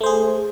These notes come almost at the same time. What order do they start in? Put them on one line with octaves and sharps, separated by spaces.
A3 C5 G#4